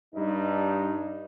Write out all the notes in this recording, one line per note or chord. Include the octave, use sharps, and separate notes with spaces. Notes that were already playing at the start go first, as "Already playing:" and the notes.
G2 D#4